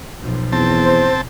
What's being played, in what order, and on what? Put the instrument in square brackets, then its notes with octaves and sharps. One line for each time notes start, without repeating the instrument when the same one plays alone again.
[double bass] B1 F3
[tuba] E2 [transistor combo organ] C4 A5
[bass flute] C5